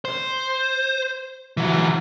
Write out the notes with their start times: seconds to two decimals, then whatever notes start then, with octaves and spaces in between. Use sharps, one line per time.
0.05 C5
1.57 E3 F#3